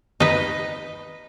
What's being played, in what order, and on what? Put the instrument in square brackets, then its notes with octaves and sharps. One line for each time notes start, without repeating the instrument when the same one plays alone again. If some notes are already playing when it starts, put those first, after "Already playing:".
[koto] D#4 B4